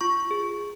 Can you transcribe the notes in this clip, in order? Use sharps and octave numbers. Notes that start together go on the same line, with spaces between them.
F4 C#6
G#4